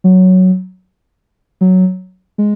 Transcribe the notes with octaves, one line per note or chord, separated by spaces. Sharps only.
F#3
F#3
G#3